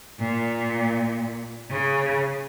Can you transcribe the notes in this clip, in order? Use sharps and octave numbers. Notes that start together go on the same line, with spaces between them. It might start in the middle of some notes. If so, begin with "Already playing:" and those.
A#2
C#3